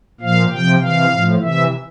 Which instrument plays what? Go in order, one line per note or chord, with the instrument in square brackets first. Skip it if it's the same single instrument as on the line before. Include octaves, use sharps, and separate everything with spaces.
[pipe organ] A#2 F3 F5
C3 F3 G5
C3 E3 F5
A2 F3
C3 E3 E5